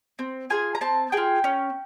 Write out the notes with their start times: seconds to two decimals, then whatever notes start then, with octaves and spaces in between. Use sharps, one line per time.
0.19 C4
0.50 F4 G#4 G#5
0.75 A#5
0.81 C4 A5
1.12 F4 G#4 G5
1.44 C#4